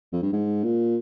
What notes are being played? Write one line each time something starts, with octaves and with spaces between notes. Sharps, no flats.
F2
G2
G#2
A#2